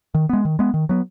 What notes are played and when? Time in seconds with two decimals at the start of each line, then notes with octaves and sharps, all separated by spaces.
0.15 D#3
0.29 G#3 B3
0.45 D#3
0.59 G#3 B3
0.74 D#3
0.89 F#3 B3